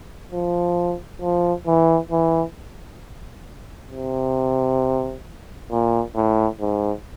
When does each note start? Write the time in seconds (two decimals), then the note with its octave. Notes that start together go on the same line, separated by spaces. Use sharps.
0.32 F3
1.22 F3
1.67 E3
2.11 E3
3.91 C3
5.71 A#2
6.15 A2
6.60 G#2